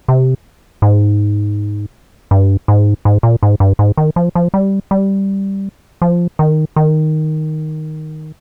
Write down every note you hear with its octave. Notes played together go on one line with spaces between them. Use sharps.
C3
G#2
G2
G#2
G#2
A#2
G#2
G2
G#2
D#3
F3
F3
G3
G3
F3
D#3
D#3